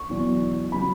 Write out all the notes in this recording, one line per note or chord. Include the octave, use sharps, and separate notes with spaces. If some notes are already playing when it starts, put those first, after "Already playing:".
Already playing: C#6
E2 B2 F#3
C#3 F#3 B5